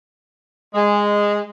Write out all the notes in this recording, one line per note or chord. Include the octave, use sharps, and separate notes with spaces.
G#3